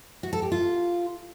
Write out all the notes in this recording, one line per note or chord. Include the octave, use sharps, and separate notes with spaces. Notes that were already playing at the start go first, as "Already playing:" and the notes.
F#4
A4
G4
F4